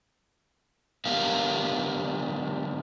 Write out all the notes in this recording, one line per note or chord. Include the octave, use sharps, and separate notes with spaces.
D3 G#3 B3 G4 A#4 F5